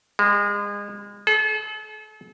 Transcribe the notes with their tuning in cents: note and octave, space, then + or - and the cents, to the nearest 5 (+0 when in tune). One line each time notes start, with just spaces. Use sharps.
G#3 -30
A4 -40